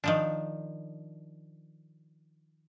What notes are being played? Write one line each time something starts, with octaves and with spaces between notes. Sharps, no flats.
D#3 F3 D4